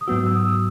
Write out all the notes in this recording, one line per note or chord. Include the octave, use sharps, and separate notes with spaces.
D#6
G#2 F#3 B3 F#4 E6
E6
D#6
E6